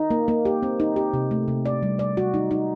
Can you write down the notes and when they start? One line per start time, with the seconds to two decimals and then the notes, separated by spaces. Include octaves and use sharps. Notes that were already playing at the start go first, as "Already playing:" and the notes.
Already playing: D#4
0.10 A#3
0.28 A#3
0.45 G4
0.63 C4
0.80 D#4
0.96 G4
1.14 C3
1.31 A3
1.48 C3
1.66 D5
1.83 G3
1.99 D5
2.17 F#4
2.34 D#4
2.51 D#4